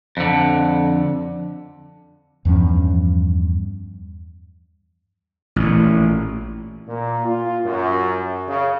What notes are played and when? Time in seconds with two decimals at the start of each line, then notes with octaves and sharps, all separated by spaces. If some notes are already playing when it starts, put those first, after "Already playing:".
0.17 F2 D3
2.45 E2 G2 F3 C#4
5.56 A1 A#2
6.87 A#2
7.25 F4
7.65 F#2
8.48 C#3